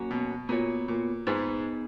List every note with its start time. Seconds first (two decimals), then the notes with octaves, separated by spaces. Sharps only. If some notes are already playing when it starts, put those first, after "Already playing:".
Already playing: F#3 A#3 C#4 F#4 C#5
0.11 B2
0.49 A#2 B3 F#4 C#5
0.88 A#2
1.27 G#2 B3 D#4 G#4 B4